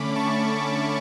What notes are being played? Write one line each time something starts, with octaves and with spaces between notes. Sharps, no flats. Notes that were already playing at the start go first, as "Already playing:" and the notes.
Already playing: D3 A3 C#4 B5 D6
A5 C#6